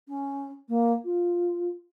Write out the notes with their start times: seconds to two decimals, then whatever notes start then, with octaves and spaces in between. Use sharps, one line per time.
0.08 C#4
0.69 A#3
1.05 F4